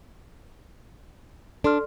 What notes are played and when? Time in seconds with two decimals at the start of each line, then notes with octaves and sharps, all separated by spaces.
1.64 D4 A4 C6 F6